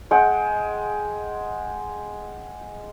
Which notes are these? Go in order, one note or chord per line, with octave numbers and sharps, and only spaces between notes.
G#3 F#5 G5